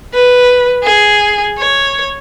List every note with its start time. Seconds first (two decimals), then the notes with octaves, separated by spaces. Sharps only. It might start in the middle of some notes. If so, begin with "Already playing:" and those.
0.14 B4
0.83 G#4
1.59 C#5